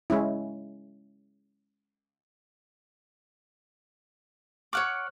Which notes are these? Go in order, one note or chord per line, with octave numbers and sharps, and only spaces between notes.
G#3 C#4 E4
C#5 F#5 C#6 D6 F6 F#6